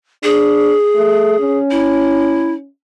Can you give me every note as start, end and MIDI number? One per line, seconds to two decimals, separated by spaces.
0.23 0.75 62
0.23 1.58 68
0.95 1.36 57
1.40 2.68 61
1.71 2.53 64